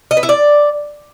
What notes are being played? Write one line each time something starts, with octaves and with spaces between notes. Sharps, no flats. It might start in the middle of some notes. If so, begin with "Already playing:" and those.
D#5
B4
E4
D5